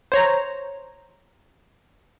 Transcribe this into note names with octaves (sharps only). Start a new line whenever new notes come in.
C5 C#5 A#5